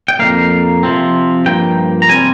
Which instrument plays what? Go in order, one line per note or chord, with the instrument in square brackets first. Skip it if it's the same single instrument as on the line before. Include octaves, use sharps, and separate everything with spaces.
[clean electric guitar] G5
F2 D#3 A#3 F5
C3 F3 C4
G2 F3 A#3 G5
A#5
C3 G3 C4 G#5